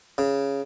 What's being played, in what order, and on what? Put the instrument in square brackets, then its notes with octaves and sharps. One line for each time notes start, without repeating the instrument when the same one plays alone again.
[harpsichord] C#3